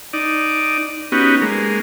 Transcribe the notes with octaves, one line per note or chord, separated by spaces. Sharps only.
D#4 D5
B3 C#4 D#4 F#4 G4
G#3 A#3